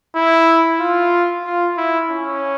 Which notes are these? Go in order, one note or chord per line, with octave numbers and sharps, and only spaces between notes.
E4
F4
F4
E4
C#4